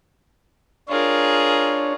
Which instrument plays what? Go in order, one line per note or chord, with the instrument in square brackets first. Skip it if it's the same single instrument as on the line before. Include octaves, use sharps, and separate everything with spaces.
[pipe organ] D4 C#5 [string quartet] F4 G#4 A#4